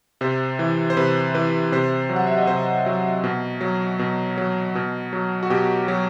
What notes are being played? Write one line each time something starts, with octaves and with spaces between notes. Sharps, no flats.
C3 C5
E3
C5
C3 B4
E3 B4
C3 C5
F#3
F#5
E5
D#5
C3 C5
F#3
B2
F#3
B2
F#3
B2
F#3
F#4
B2 G4
F#3